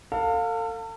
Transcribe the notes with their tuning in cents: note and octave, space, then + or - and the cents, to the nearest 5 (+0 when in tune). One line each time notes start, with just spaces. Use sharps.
A4 +40 F5 +20